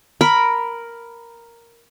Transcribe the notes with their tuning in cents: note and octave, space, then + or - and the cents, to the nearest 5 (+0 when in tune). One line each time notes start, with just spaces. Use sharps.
A#4 +0 B5 +0